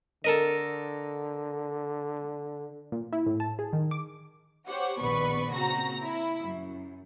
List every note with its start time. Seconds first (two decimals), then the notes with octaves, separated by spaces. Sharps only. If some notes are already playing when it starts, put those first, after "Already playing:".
0.24 D3 A4 A#4 D#5
2.92 A#2
3.13 E4
3.26 A2
3.40 A5
3.59 G#4
3.73 D#3
3.91 D6
4.67 G4 C5 C#5 F#5
5.00 A#1 D#2 B3 B4 D5 C#6
5.53 A#2 C#3 C4 F#4 A#5 A#6
6.02 E4
6.43 F#2